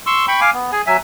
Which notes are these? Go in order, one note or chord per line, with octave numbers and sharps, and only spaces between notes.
C6 C#6 E6
G5 B5 C#6
F5 G#5 D6
B3
G#4 G#5
F#3 E5 G#5